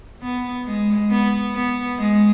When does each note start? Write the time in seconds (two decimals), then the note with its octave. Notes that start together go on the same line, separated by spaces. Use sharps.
0.22 B3
0.66 G#3
1.10 B3
1.55 B3
1.99 G#3